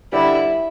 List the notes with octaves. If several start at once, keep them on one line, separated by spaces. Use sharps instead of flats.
D3 G3 D4 E4 G4 B4